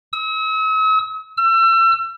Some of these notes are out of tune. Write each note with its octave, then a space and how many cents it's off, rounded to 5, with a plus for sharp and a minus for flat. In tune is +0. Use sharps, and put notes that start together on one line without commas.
E6 -45
E6 +35